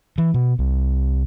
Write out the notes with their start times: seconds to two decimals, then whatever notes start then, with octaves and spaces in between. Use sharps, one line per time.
0.18 E3
0.34 B2
0.59 C2